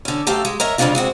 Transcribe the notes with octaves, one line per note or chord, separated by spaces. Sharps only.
D3 C#4
F#2 A3 G4 A4 F5
G#3
A#4 C#5 D#5 E5
F2 C#3 F3 G#3 D4 F4
G#3 C4 F#4